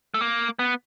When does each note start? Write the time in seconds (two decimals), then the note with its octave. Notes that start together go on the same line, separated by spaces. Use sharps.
0.14 A3
0.21 A#3
0.59 B3